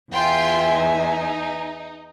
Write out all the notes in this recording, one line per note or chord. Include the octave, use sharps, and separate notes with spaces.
E2 F4 E5 G5 G#5 C6
D#4